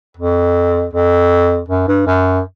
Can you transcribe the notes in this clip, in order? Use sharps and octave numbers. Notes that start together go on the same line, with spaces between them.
F2
F2
F#2
G2
F#2